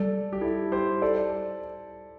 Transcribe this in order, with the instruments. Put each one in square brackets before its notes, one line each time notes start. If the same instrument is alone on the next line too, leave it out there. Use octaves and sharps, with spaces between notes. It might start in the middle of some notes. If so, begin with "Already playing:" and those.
Already playing: [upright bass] G3 [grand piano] A4 D5
[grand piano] G4
E4 A4
G4 C5
A4 D5